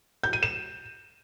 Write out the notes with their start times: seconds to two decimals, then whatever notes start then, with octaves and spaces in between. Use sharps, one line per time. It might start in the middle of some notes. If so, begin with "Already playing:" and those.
0.23 G6
0.33 D#7
0.43 E7